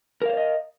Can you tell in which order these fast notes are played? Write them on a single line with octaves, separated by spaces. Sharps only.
A#4 F5 C5 D5 D#5